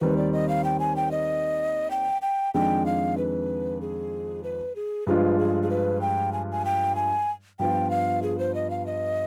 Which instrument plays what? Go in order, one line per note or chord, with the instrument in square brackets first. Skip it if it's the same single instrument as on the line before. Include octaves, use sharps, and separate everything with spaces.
[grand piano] D#2 D#3 G3 C4 [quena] B4
[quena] D5
D#5
F5
G5
G#5
G5
D#5
G5
G5
[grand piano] F2 D#3 G#3 D4 [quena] G5
[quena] F5
B4
G#4
B4
G#4
[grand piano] G2 F3 G#3 D4 F4 [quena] B4
[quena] G#4
G#4
B4
G5
G#5
G#5
G5
G#5
[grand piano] G2 F3 B3 F4 [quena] G5
[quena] F5
G#4
C5
D#5
F5
D#5